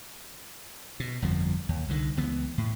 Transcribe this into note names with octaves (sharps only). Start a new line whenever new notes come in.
B2
G1 F2 F3
D#2
C2 D3 D#3
C#2 E3 B3
A2